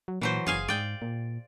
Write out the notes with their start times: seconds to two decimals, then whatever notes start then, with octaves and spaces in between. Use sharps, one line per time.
0.08 F#3
0.21 A#2 E3 F#3 C5
0.47 F#1 G#4 F5 G#5
0.68 G#2 D5 G5
1.02 A#2